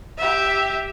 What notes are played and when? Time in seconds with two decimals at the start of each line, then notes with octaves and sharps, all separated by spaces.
0.18 G4 E5